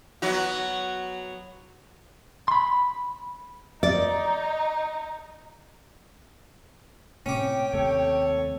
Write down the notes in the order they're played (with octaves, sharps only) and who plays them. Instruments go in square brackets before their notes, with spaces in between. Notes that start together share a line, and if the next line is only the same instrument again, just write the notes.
[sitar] F#3 B3 F#4
[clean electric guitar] B5 C6
[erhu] D#4 [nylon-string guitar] D5
[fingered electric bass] A2 C3 [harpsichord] C#4 D6 [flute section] G5
[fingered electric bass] D#2 C3 A3 [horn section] A4 C#5